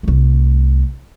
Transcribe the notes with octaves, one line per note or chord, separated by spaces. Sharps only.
C2 A3